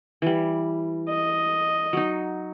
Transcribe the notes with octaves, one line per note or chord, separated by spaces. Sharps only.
E3 G3
D#5
F#3 D#4